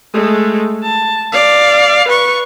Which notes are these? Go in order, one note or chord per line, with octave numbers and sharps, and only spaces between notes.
G#3 A3
A5
D5 F5
B4 C#6